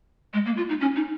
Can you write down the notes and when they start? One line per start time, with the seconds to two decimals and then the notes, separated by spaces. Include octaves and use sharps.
0.33 G#3
0.46 A#3
0.57 F4
0.69 D#4
0.80 C#4
0.96 D#4